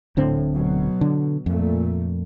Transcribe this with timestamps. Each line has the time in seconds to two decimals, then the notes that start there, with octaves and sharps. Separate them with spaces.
0.17 D1 A2 D3 C4
0.52 B2 F#3
1.01 D3
1.46 F2 A#2 A3